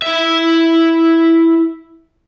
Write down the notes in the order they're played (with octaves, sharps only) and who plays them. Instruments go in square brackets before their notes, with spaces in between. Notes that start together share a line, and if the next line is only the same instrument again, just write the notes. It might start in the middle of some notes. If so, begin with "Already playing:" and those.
[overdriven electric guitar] E4 E5